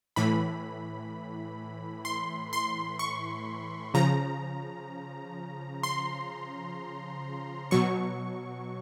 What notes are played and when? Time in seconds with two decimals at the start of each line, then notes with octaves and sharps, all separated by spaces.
0.16 A2 E3 B5
2.05 C6
2.53 C6
2.99 C#6
3.94 C#3 F3 A#5
5.83 C6
7.71 B2 F#3 C#6